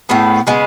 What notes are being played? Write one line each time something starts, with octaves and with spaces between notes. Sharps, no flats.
A2 G#3 B3
C#3 G#3 B3